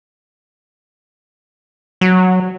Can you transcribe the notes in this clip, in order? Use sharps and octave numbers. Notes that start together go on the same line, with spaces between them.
F#3